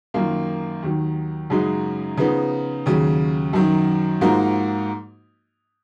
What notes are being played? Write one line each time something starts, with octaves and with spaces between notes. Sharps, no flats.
F#2 D#3 A#3 F4
D#2 D#3 F#3
F#2 C#3 G#3 D#4 F#4
C#3 F3 B3 D#4
D#2 C#3 F#3
F#2 D#3 F#3
G#2 F3 A#3 D#4 F#4